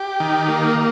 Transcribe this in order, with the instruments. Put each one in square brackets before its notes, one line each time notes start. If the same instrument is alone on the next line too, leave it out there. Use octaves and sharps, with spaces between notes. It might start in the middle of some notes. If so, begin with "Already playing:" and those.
Already playing: [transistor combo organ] G4
D#3
A#3